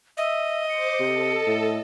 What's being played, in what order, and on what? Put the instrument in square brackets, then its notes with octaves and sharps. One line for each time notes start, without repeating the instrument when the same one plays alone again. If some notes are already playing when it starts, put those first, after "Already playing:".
[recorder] D#5 [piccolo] E5
[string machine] C5 D6 [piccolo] C#7
[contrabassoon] C3 [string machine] A4
[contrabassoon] A2